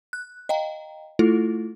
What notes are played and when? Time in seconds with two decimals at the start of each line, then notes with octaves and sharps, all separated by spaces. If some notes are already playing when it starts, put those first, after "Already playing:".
0.13 F#6
0.49 D#5 F5 G5 A#5
1.19 A3 E4 F4 A4